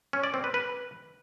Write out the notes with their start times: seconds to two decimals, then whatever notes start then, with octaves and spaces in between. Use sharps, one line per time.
0.13 C#4
0.24 D5
0.34 C4
0.44 B4
0.54 B4